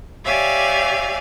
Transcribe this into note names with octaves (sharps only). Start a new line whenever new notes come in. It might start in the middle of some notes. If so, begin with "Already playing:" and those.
G4 C#5 D5 E5 F5 G#5